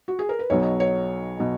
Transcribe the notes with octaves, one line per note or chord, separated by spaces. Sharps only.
F#4
G#4
A#4
B4
B1 B2 F#3 C#5
C#5
B2 F#3